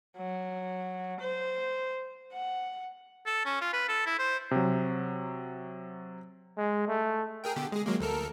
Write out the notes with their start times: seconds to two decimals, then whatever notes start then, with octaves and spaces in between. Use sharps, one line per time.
0.17 F#3
1.20 C5
2.33 F#5
3.26 A4
3.46 C#4
3.61 F4
3.73 B4
3.89 A4
4.06 E4
4.19 C5
4.51 C3 F#3
6.57 G#3
6.88 A3
7.44 G#4 A#4 G5
7.56 B2 D3 G4
7.72 G#3 G#4
7.86 F#3 G#3 A#3
8.00 D2 A4 A#4